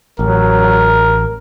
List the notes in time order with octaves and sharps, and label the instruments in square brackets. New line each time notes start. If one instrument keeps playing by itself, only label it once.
[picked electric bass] A1 [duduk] F#3 [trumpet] A#4